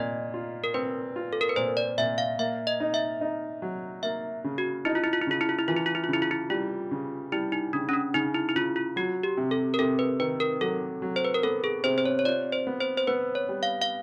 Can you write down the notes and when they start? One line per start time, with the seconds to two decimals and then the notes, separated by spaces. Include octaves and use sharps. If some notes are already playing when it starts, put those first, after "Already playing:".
Already playing: A#2 D#5
0.34 F4
0.64 A#4
0.74 C4 B4
1.16 F4
1.33 A4
1.41 A#4
1.49 B4
1.56 A#2 C5
1.77 D5
1.98 A#2 E5
2.18 F5
2.39 A#3 E5
2.67 D#5
2.80 D#4
2.94 E5
3.21 D#4
3.62 F#3
4.03 A#3 E5
4.44 C#3
4.58 F#4
4.85 D#4 E4
4.95 F4
5.04 E4
5.13 F4
5.22 E4
5.27 C#3 F4
5.41 E4
5.49 F4
5.59 E4
5.68 E3 F4
5.77 E4
5.86 F4
5.95 E4
6.04 F4
6.09 C#3 E4
6.22 F4
6.31 E4
6.50 G3 F4
6.91 C#3
7.32 G3 E4
7.52 D#4
7.73 C#3 D4
7.89 C#4
7.93 D4
8.14 C#3 D#4
8.34 E4
8.49 E4
8.55 C#3 F4
8.76 F4
8.96 F#3 F#4
9.23 G4
9.37 C3
9.51 A4
9.74 A#4
9.79 C3 A4
9.99 B4
10.20 D#3 B4
10.40 A#4
10.61 F#3 A4
11.02 F#3
11.16 C5
11.25 B4
11.34 A#4
11.43 B3 A4
11.64 G#4
11.84 C3 C5
11.98 C5
12.06 C#5
12.19 C#5
12.25 F4 D5
12.52 C5
12.67 B3
12.81 C5
12.97 C5
13.07 B3 B4
13.35 C#5
13.49 G3
13.63 F5
13.82 F5